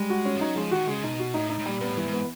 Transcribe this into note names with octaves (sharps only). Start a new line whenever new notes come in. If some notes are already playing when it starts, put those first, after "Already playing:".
Already playing: G3 G#3
F#4
C#4
F3
F#3 D#4
F3 G#3
D#3 F#4
C#3 G#3
B2 D#4
F#4
A2 D#4
D#4
A2
A#2 G3
A#2 B3
A2
G2 E3
G#2
B3